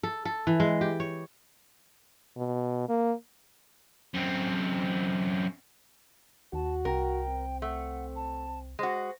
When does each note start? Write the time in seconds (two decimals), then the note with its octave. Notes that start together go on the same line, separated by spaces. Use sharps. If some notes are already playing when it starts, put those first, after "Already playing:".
0.03 A4
0.25 A4
0.47 E3
0.60 G#3
0.81 G4
1.00 C#5
2.37 B2
2.89 A#3
4.14 F#2 C4
6.53 D#2 F#4 A5
6.85 C2 A#4 G5
7.29 C4
7.62 A3 F#5
8.15 A5
8.79 G#3 F#4 C5